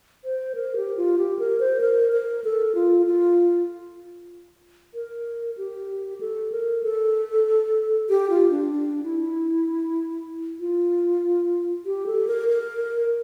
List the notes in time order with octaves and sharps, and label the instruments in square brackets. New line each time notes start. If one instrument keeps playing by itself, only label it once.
[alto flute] C5
A#4
G4
F4
G4
A#4
C5
A#4
A#4
A4
F4
F4
A#4
G4
A4
A#4
A4
G4
F4
D4
D4
E4
F4
G4
A4
A#4
A#4